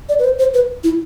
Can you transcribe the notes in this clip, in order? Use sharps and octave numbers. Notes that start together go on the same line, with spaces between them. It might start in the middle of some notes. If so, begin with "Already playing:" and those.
D5
B4
C5
C5
B4
E4